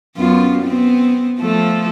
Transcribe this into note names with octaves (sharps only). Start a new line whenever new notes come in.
F#2 B3 F4
B3 C4
F3 A3 A4